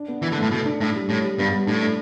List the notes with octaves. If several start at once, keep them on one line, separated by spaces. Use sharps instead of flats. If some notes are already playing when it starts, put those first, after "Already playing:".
Already playing: D4
B3
E3 E4
D3
A3
A2
B2 A4
D4
A2 D4
G3
A2 C#4
G3
G2 B3
G3
A2 D4
A3